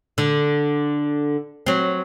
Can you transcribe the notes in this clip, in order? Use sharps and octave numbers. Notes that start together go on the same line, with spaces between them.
D3
F#3 C4